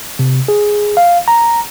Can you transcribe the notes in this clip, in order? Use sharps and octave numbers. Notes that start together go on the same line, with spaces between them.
C3
G#4
F5
A#5